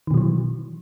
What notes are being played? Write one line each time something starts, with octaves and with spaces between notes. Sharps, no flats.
B2 D#3 E3 F#3